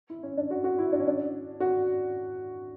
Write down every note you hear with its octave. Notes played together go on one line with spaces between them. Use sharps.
E4
C#4
D4
F#4
F#4
E4
D4
C#4
D4
F#4